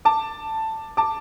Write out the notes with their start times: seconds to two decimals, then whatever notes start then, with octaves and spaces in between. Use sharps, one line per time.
0.05 A5 D6
0.97 A5 D6